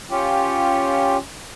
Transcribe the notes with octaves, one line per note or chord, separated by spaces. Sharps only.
C#4 F4 G4